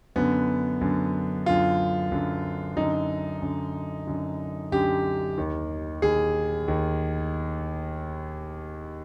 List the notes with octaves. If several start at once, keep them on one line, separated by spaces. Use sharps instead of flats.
F#2 D3 B3
F#2 D3
F#2 D3 F4
F#2 D3
F#2 D3 D#4
F#2 D3
F#2 D3
F#2 D3 G4
D#2 D#3
D#2 D#3 G#4
D#2 D#3